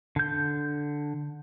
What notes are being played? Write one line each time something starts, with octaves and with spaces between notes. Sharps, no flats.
D3 G6